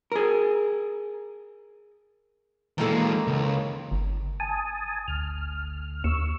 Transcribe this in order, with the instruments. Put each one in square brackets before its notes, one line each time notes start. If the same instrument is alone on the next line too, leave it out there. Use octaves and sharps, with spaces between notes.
[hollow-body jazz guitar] G#4 A#4
[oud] D#3 A#3 A4 [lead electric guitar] E3 G#3
[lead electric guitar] C#2
[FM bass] G1
[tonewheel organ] G#5 A5 D#6
D2 F6
[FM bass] D#2 [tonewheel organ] C#6 E6